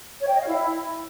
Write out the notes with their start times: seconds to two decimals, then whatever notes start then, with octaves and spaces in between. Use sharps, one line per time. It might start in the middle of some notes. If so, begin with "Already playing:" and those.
0.21 C#5
0.27 G5
0.34 D#5
0.41 F5
0.47 E4